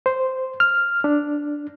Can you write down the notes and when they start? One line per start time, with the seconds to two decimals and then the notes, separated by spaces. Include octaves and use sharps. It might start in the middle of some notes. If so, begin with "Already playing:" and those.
0.06 C5
0.60 F6
1.04 D4